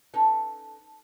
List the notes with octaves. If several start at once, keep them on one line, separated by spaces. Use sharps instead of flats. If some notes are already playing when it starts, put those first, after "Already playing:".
C#4 D#4 A4 B4 A5